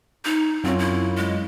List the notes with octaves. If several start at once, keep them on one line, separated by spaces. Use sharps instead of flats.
D#4
F#2 C4 F4 C#5
E4
G#3